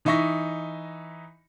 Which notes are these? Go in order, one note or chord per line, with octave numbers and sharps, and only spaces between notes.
E3 D#4 D#5 E5 C#6 A#6